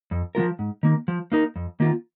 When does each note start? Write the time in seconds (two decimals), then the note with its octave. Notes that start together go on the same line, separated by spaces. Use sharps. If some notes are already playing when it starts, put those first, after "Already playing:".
0.11 F2
0.35 F3 G#3 F4 A#4
0.59 G#2
0.83 D#3 A#3
1.08 F3
1.32 A#3 D#4 A#4
1.56 F2
1.80 D#3 A#3 F4